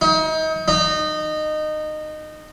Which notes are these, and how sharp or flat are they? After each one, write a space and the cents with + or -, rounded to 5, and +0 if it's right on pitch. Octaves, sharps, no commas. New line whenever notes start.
D#4 +35
D#4 -20